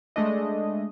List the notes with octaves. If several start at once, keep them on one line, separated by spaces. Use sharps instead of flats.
G#3 A3 D4 D#5